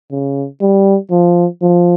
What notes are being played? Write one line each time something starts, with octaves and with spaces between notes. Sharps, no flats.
C#3
G3
F3
F3